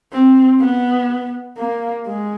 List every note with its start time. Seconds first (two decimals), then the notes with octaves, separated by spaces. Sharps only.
0.12 C4
0.60 B3
1.57 A#3
2.06 G#3